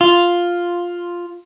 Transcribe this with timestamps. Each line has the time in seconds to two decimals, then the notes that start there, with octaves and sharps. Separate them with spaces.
0.01 F4